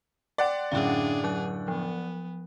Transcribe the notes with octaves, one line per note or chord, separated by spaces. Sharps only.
D5 F#5 G5 C6
F#2 A2 D3 D4 G#4 F5
F#3 F#6
F3 B3